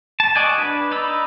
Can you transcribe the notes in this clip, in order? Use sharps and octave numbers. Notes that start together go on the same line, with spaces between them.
A5
F#4 D5 D#5 G#5
D4 B4
D#4 D5 B5 E6